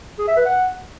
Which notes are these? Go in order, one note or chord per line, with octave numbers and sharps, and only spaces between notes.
G#4
E5
B4
F#5